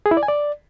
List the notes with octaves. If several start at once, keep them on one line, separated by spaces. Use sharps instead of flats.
G#4
E4
D5
G#5
D5